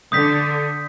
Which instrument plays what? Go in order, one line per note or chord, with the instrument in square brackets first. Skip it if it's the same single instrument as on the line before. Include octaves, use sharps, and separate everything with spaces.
[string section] D3 [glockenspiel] D#6 G6 B6